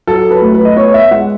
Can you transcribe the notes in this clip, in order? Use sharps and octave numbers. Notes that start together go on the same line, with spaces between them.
F#3 A4
B4
A3
B4
D#5
B3 C#5
E5
G#3 F#5